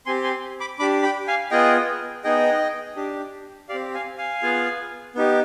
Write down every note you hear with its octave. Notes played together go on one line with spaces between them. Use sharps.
C4 G4 G#5 C6
G#5 C6
B5 D6
D4 G4 B5 D6
G5 B5
F5 G#5
B3 F4 G#4 D#5 G5
B3 D#4 G#4 D#5 G5
D4 G4
C4 G4 D5 F5
F5 G#5
F5 G#5
B3 F4 G#4
B3 D#4 G4